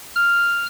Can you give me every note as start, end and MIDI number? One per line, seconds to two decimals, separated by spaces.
0.16 0.66 89